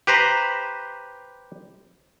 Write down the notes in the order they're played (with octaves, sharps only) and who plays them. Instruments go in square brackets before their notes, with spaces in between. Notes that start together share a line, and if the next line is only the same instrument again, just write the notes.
[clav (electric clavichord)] G4 B4 C5 A#5